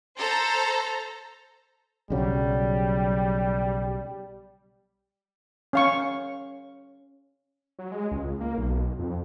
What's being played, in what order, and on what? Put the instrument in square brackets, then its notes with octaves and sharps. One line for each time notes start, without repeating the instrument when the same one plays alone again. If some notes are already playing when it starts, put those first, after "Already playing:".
[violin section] A4 C5 A#5
[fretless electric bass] B1 C#3 F#3 [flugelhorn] G3
[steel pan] C#4 F5 C#6
[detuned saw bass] F#3
G#3
C#2
A#3
B1
F2